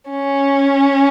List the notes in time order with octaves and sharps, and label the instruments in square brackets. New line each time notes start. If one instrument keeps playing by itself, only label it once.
[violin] C#4